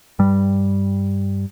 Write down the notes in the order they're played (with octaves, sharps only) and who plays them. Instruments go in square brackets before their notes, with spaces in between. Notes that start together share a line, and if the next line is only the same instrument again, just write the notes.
[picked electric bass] G2 G3